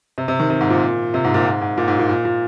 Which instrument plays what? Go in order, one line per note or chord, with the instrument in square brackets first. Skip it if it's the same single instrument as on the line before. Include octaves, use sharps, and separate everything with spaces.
[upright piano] C3
C3
D#3
C3
G#2
A#2
C3
G#2
A#2
G#2
G#2
A#2
G#2
A#2
A#2
A#2